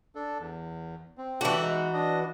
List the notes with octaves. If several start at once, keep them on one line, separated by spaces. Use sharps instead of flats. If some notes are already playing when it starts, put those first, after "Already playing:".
D4 A4
E2
C4
E3 A3 D4 F#4 G4
G#3 D#4
D4 D#5